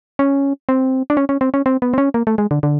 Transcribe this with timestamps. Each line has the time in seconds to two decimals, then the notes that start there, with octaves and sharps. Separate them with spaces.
0.19 C#4
0.69 C4
1.10 D4
1.17 C#4
1.29 C#4
1.41 C4
1.54 C#4
1.66 C4
1.82 B3
1.94 C4
1.98 C#4
2.14 A#3
2.27 A3
2.38 G#3
2.51 D3
2.63 D3